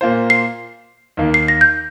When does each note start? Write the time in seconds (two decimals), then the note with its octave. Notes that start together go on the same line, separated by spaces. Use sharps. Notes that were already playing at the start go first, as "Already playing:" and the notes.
0.01 A#2 A#3 F4 C5
0.30 C7
1.17 D#2 D#3 A#3
1.34 C7
1.48 A#6
1.61 G6